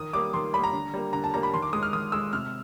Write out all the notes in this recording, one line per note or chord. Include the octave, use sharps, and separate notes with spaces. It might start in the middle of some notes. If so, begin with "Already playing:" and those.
Already playing: D#3 D#6
G3 A#3 D6
D#3 C6
G3 A#3 B5
A#5
D3
G3 A#3
D3 A#5
A5
G3 A#3 A#5
B5
D#3 C6
D6
G#3 D#6
F6
D#3 D#6
G#3 E6
C3 F6